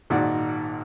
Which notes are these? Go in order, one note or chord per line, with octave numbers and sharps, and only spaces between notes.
G#1 A#2 D#3 F#4 D5 F#5